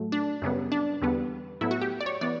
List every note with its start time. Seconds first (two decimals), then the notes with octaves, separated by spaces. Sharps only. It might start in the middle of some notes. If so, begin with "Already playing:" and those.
Already playing: A2 F#3 A3
0.12 D4
0.42 F#2 C#3 G3 B3
0.72 D4
1.02 E2 D3 G3 B3
1.61 A2 F#3 B3 E4
1.71 F#4
1.82 G4
2.01 D5
2.06 C#5
2.21 E3 B3 D5